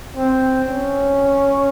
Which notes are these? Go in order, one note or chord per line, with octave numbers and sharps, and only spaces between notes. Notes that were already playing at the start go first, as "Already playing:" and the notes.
C4
C#4